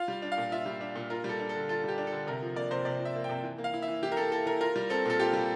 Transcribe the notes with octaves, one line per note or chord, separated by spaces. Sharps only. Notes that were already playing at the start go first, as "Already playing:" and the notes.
Already playing: F4 F5
G3
D4
F5
A#2
F4 E5
G3
D4
A#2
F4 A#4
G3 A4
D4
A4
D3
F4 A4
G3 G4
D4
A4
D3
C3 A#4
F3
A#3 D5
C3 C5
C3 D5
F3
E5
A#3
C3 G5
E3
A#3
F5
E4
E5
E3
E3 G4
A#4
A#3 A4
E4 A4
E3 A#4
F4 A#4
G3
C4 A4
A#2 A4
F4 G4
G3